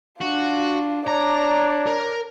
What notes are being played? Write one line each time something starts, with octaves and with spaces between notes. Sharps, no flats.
D4 F4 F#4
D4 C#5 D5 A#5
A#4